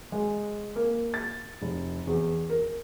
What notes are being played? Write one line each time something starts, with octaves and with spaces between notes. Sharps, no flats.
G#3
A#3
A6
F1
E2
A#4